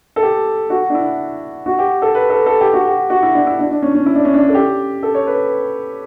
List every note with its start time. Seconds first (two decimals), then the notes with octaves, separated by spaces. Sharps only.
0.16 A4
0.22 G4
0.70 F#4
0.90 D4
0.95 E4
1.66 F#4
1.79 G4
2.02 A4
2.15 B4
2.30 A4
2.46 A4
2.61 G4
2.73 F#4
2.88 G4
3.10 F#4
3.22 E4
3.34 D4
3.47 E4
3.59 D4
3.71 D4
3.82 C#4
3.95 C#4
4.06 E4
4.15 D4
4.25 C#4
4.34 D4
4.48 A4
4.54 G4
5.03 A4
5.15 C#5
5.27 B4